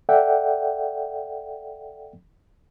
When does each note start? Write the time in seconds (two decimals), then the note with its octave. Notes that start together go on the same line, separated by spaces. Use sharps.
0.09 A4 D5 E5 F#5 G5